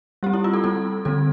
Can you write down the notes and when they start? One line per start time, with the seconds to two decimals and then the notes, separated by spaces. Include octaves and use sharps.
0.23 G3 C4 G4
0.33 E4
0.44 F4
0.53 A4
0.64 G3 C4 A4
1.05 D3 G3 C4 A4